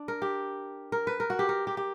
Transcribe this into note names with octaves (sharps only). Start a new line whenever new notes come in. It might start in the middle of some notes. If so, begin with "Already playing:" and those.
Already playing: D4
A#4
G4
A#4
B4
A#4
F#4
G4
A#4
G4
G4